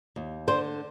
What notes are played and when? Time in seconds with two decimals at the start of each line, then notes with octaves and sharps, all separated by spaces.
0.16 D#2
0.48 D3 C5